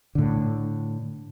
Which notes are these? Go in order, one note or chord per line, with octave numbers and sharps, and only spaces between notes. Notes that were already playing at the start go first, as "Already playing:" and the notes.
A2 D3